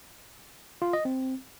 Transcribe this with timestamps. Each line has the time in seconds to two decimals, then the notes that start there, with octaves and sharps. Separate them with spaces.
0.82 F4
0.93 D#5
1.05 C4